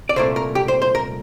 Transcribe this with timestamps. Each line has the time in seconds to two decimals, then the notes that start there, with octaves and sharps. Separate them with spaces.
0.09 D5
0.16 C2 A#2 A3 C5
0.36 A#4
0.55 G4
0.68 C5
0.82 C5
0.95 A#4